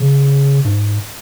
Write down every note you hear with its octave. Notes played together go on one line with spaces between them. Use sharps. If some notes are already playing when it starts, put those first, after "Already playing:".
Already playing: C#3
G#2